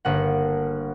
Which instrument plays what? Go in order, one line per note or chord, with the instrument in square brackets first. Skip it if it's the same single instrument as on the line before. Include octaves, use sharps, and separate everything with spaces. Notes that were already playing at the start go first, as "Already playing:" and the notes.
[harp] G1 A#3 F#5